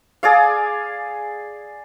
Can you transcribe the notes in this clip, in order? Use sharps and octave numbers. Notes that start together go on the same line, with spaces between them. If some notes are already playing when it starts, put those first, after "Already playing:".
G#4 D5 F5